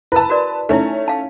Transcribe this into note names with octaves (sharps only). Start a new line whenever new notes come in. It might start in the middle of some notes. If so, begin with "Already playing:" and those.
E4 B4 A5 E6
F#4 A#4 D5
A3 C#4 D#4 E4
F5 A5